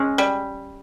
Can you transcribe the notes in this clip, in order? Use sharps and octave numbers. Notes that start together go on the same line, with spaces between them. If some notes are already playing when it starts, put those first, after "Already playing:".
Already playing: G#3 C#4
G3